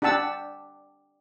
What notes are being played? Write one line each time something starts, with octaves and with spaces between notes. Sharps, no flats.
D4 G4 F#5 A5 E6